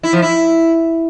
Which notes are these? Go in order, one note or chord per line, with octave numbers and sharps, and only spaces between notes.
E4
F3
E4